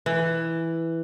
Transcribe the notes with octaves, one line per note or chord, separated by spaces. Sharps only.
E3